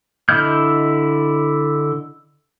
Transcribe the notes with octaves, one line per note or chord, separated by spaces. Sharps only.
D3 E4 D#5 F6 G6